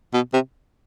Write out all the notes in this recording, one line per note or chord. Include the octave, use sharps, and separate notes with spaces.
B2
C3